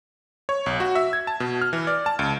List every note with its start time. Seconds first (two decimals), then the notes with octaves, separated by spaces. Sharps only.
0.49 C#5
0.66 B1
0.80 F#4
0.95 E5
1.13 G#6
1.27 A5
1.40 B2
1.61 F6
1.73 E3
1.87 D5
2.06 A5
2.19 C#2